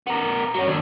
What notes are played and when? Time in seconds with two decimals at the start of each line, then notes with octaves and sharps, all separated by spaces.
0.07 B3 A#4
0.54 F#3 C#4
0.67 D#2 D4